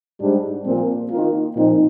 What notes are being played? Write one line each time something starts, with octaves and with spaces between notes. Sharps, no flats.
G#2 G3 D4
A#2 F3 C4
D#3 A#3 F4
A#2 F3 C4 D#4